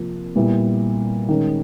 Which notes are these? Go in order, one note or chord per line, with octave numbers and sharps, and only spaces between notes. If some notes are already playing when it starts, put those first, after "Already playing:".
Already playing: C3 F3 A#3
A#2 G3 B3 E4
D#3 G#3 C#4